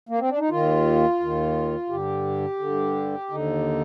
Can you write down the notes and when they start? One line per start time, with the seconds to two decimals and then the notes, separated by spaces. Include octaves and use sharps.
0.09 A#3
0.19 C4
0.29 D4
0.39 D#4
0.49 D#2 D#3 F4
1.20 D#2 D#3
1.89 G2 D3 G4
2.59 G2 D3
3.29 D#2 D3 D#4